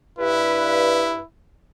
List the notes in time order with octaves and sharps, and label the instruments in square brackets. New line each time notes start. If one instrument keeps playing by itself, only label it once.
[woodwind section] G2 B4 [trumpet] E4